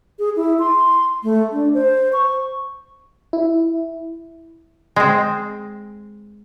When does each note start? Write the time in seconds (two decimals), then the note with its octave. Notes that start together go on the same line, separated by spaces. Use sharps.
0.19 G#4
0.36 E4
0.59 C6
1.23 A3
1.52 D4
1.74 C5
2.13 C#6
3.33 E4
4.96 G#3 C4